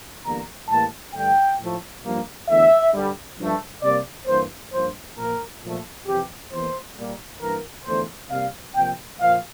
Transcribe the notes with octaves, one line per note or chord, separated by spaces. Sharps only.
E2 D3 G3 A#3 A#5
A2 E3 G3 A#3 A5
G2 D3 A3 G5
A2 F3 A3
G2 F3 A#3
E2 D3 A3 E5
G2 D3 G3
G2 F3 A3
C3 G3 A#3 D5
G2 E3 A#3 C5
G2 F3 A#3 C5
A#2 F3 A#3 A#4
A#2 F3 A3
F2 C3 E3 G4
E2 E3 A#3 C5
A#2 G3 A#3
G2 E3 A#3 A#4
E2 D3 F3 A3 C5
C3 G3 A#3 F5
C3 F3 A#3 G5
A#2 F3 A#3 F5